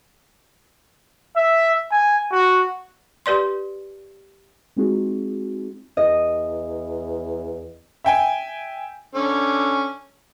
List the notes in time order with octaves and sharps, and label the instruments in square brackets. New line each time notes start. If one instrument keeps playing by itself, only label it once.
[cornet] E5
G#5
F#4
[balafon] G4 B4 D5 C6
[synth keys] G#3 C4 D#4 F4 F#4 G#4
[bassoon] E2 [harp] D#5
[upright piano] E5 G5 G#5
[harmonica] D3 C#4